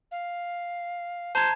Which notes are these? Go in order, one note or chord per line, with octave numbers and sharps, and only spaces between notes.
F5
C5 A5 A#5 G#6